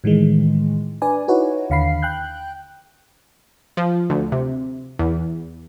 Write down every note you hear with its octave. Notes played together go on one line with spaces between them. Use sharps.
A2 D#3 E3 G#3
D4 B4 D5 G#5
D#4 E4 F#4 B4 C#5
D#2 D3 F5 B5 C7
G5 F#6 G6
F3
D2
C3
E2